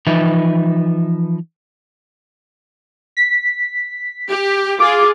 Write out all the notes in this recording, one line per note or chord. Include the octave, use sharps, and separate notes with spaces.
E3 F3 D#4 B4 E5
B6
G4
F4 G#4 D6